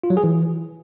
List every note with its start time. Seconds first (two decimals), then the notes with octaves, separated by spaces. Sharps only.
0.03 F4
0.10 F#3
0.17 G#4
0.24 E3